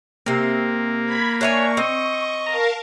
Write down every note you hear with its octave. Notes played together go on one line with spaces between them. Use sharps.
C3 A#3 C4
B5 G#6 B6
D4 C#5 E5 G#5 C#6
C4 D#5
A#4 F5 A5 A#5